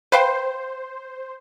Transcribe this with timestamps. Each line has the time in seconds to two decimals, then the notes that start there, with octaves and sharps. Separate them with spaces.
0.12 B4 C5 F5 G5